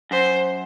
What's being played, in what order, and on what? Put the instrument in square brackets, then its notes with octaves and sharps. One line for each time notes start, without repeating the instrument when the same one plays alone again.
[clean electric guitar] F#2 [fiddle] C5